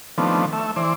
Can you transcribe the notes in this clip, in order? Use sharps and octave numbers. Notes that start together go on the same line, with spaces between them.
D#3 F3 A3 B3 C4 D4
A3 E5
E3 C5 D5